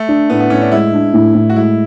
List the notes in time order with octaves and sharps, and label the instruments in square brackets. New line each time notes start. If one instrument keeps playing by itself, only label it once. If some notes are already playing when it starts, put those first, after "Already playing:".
Already playing: [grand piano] A3
[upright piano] D4
[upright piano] A2 [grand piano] B3
[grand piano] B3
[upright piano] A2 [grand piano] C#4
[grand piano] D4
[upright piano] G#3 [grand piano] E4
[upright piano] D4
A2
A2
[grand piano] F#4
[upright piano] G#3 [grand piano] E4